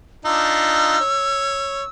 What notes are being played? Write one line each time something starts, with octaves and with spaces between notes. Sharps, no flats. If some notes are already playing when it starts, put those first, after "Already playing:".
D4 D#4 F4 E6
C#5